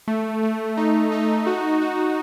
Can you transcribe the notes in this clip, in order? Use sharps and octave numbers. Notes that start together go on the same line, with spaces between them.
A3
A3
D#4
D#4
F#4
F#4